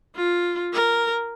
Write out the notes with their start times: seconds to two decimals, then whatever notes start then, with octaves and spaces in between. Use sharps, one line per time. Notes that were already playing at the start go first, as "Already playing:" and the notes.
0.15 F4
0.73 A#4